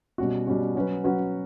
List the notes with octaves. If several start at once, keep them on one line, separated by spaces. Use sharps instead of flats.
B2 G3 C#4 F#4
B2 G3 C#4 F#4
F#3 C#4 F#4 B4
F#3 C#4 F#4 B4